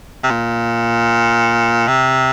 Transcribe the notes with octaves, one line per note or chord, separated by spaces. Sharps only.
C3
A#2
C3